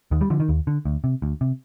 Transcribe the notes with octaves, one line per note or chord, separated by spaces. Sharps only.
D#2 D#3
G3
D3 F3
D#3
D#2
D3
D2
C3
D2
C3